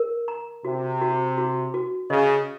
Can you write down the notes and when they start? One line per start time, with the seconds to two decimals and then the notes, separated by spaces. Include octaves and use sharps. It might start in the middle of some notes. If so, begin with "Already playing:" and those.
Already playing: A#4
0.28 A#5
0.65 C3 F#4
1.01 F#4
1.38 F#4
1.74 F#4
2.10 C#3 D#5